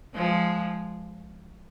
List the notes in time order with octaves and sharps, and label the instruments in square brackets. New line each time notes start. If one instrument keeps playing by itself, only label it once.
[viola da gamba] F3 G#3